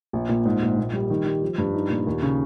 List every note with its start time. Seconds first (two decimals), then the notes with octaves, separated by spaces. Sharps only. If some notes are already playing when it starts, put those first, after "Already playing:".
0.13 A#1
0.29 A#2
0.45 G#2
0.62 A#1
0.77 A#2
0.93 G3
1.10 D#3
1.26 G3
1.43 F3
1.58 G2
1.74 D#4
1.90 A#2
2.07 D#2
2.22 C#3